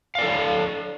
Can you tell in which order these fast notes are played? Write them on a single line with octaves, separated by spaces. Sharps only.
F5 D5 A4